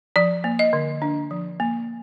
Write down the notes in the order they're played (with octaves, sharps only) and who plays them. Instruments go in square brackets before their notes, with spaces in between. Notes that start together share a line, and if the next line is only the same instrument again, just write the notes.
[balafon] F3 D5
A#3
D#5
D3
D4
F3
A#3